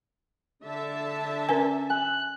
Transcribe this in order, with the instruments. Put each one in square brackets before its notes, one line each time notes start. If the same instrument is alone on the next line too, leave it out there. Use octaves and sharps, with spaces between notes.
[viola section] D3 E5 A5
[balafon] C#4 A#4 B4 [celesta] G#5
[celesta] G#5 [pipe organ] F#6